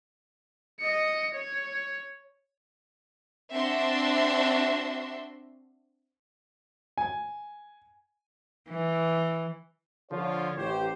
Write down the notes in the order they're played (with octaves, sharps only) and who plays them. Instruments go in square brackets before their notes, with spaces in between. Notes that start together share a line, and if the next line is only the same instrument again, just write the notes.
[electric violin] D#5 C#7
C#5
[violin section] C4 D4 F#4 E5 C6
[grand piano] G#5
[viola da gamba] E3
[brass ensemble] D3 F3 F4 [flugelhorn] C#5
[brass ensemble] A1 G4 C5